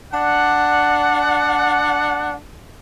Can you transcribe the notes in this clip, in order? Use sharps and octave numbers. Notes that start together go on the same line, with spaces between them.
D4 D5 F#5